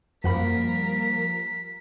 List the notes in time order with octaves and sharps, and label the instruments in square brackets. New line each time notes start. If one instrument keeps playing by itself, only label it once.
[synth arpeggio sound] F#2 F#5 B5 [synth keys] F3 G3 A#3 [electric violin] A#4 [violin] B6